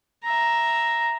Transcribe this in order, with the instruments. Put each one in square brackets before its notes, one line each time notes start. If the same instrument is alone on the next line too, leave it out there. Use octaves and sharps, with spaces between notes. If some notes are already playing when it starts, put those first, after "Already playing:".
[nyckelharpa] E5 A#5